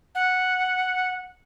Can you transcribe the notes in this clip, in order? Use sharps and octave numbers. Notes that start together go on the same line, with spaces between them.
F#5